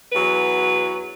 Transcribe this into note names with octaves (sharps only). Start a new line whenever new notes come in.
E2 F#3 B4